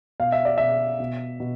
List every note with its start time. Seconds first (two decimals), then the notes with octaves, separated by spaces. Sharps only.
0.20 B2 F5
0.32 E5
0.45 D5
0.58 B2 E5
1.00 B2
1.40 B2